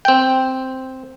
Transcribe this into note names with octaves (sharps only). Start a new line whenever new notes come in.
C4 G5